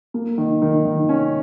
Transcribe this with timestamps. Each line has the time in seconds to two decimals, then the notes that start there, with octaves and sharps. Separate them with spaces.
0.14 A#3
0.38 D#3
0.62 D#3
0.85 D#3
1.09 C#4